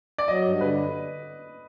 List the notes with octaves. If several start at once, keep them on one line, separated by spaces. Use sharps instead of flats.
D5
F#3 D#5
G2
D3 B4